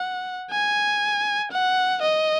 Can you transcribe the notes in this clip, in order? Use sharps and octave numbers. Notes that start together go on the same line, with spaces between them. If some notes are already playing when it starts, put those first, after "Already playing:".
Already playing: F#5
G#5
F#5
D#5